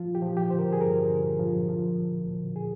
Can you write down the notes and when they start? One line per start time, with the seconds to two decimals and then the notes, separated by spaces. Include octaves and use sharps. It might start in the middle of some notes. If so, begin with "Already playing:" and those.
Already playing: F3 F4
0.15 G4
0.22 F3
0.37 G4
0.50 D3 C5
0.59 A#4
0.73 G#4
0.80 G2 A#4
1.10 D3
1.39 F3
1.68 F3
1.98 D2
2.27 D2
2.56 G#4